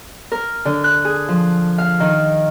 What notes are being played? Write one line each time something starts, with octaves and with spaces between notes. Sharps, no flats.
A#4
D3
F#6
G#4
F3
F5
D#3